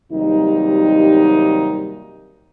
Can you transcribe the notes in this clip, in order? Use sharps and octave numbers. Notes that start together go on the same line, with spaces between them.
D#2 C3 F#3 G3 D#4